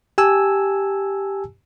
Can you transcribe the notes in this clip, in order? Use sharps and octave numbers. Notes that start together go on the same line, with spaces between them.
G4 G#5 A5 E6